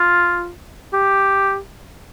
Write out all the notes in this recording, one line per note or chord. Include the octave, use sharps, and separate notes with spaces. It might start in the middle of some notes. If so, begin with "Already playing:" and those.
Already playing: F4
G4